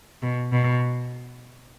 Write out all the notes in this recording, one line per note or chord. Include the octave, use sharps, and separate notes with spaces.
B2
B2